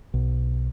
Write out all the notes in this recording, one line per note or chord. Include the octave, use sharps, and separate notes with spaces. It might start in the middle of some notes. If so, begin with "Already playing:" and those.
B1